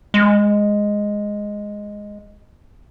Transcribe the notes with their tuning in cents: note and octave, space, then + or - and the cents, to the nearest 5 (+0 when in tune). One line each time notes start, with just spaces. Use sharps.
G#3 -5